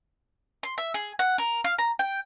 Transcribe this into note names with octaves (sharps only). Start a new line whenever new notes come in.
C6
E5
G#4
F#5
A#4
F5
A#5
G5